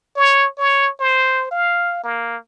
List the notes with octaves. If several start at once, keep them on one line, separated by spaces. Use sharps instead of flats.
C#5
C#5
C5
F5
A#3